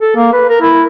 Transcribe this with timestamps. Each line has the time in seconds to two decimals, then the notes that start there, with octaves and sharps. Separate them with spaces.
0.01 A4
0.16 A#3
0.32 B4
0.49 A#4
0.61 E4